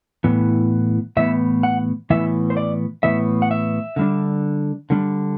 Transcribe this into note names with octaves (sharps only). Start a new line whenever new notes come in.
A2 E3 B3
A2 E3 B3 E5
F#5
A2 E3 B3 E5
C5
D5
A2 E3 B3 E5
F#5
E5
D3 G3 D4
D3 G3 D4